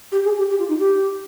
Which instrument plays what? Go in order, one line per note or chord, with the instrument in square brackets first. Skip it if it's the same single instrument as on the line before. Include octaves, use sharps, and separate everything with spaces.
[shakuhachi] G4
G#4
G4
G4
F4
D#4
G4